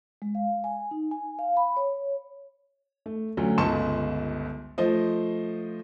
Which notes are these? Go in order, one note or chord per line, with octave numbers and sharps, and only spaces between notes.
G#3
F5
G#5
D#4
G#5
F5
B5
C#5
A3
D2 F#3 C#4
G1 C#2 A5 C6 C#6 E7
F3 A3 C5 D#5